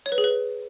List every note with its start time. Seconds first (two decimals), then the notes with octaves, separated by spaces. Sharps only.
0.06 C#5
0.12 B4
0.18 G#4
0.24 B4